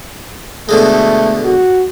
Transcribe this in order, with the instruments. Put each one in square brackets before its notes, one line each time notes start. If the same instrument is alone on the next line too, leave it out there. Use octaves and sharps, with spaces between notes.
[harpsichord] B2 D3 G#3 [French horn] A3
[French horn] F#4